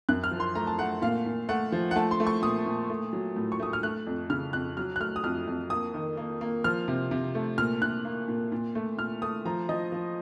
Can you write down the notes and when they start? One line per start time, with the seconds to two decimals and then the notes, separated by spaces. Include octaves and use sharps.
0.09 F#2 F#6
0.24 F6
0.31 F3
0.40 C6
0.55 A3 A#5
0.67 A5
0.79 A3 F#5
1.02 A#2 F5
1.26 A#2
1.49 A3 F#5
1.72 F3
1.91 F#5
1.96 A3 A5
2.11 C6
2.20 A3
2.27 C#6
2.42 A#2 D#6
2.66 A#2
2.90 A3
3.13 F#3
3.36 A2
3.52 C#6
3.60 A3 D#6
3.73 F6
3.83 A3 F#6
4.07 F2
4.30 C#3 F6
4.53 F2 F#6
4.77 F#3 F6
4.96 F#6
5.00 A3 F6
5.16 D#6
5.24 F2 F6
5.47 F2
5.70 A#3 D#6
5.94 D#3
6.17 A#3
6.41 A#3
6.64 F3 F6
6.88 C3
7.11 C3
7.35 A3
7.58 A#2 F6
7.82 A#2 F#6
8.05 A#3
8.28 A#2
8.52 A#2
8.75 A3
8.98 A#2 F6
9.22 A3 D#6
9.45 F3 A#5
9.69 F3 D#5
9.92 F3